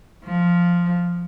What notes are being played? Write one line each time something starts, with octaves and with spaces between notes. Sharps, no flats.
F3